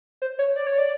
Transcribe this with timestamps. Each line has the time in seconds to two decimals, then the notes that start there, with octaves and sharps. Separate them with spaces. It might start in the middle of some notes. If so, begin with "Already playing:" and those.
0.22 C5
0.39 C#5
0.56 D5
0.67 C#5
0.78 D5